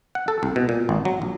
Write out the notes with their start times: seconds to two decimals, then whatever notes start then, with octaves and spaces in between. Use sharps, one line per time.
0.15 F#5
0.28 A4
0.43 C2
0.56 B2
0.69 A#2
0.89 G#1
1.05 F#3
1.22 A#1